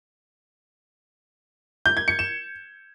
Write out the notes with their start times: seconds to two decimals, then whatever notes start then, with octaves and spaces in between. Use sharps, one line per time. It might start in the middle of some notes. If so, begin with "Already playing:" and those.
1.86 G6
1.97 G#6
2.08 C#7
2.19 E7